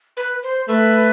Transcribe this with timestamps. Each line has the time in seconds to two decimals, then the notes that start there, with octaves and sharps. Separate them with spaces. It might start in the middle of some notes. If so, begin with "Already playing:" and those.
0.17 B4
0.43 C5
0.68 A3 B4